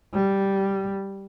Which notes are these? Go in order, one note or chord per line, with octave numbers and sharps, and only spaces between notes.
G3